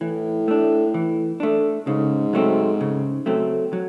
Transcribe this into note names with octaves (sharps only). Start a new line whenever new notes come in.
A2 E3
A3 D4
E3
A3 D4
G#2 C#3
F#3 A3 C4
C#3
F#3 A3 C4
F#3